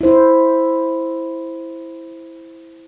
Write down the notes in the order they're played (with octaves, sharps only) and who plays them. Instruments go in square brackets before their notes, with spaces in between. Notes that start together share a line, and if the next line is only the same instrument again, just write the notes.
[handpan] E4 C5